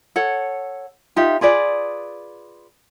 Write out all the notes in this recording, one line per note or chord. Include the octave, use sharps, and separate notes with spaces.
A4 C#5 F#5
D#4 F4 G4 E5
F4 G#4 B4 D5